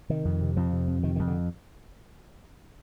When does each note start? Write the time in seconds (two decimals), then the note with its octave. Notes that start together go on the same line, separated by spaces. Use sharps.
0.09 C3 D#3
0.25 F2
0.41 C3
0.56 F2 F3
0.72 C3
0.88 F2
1.03 C3 D#3
1.16 F2 D#3
1.27 D3